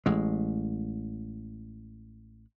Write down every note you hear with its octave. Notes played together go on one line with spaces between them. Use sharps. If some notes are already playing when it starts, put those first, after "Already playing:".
A1 G#3